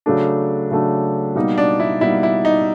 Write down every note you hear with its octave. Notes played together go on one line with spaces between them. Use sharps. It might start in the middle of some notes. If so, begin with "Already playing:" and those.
C#3 F#3 A3 D4
C#3 F#3 A3 D4
B2 G3 A#3 D#4
D4
E4
B2 G3 A#3 D#4 E4
E4
D#4